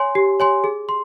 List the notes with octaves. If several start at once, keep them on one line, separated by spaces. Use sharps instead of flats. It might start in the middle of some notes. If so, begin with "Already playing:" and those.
Already playing: C#5 G#5 C6
G4
C#5 G#5 C6
G#4
C6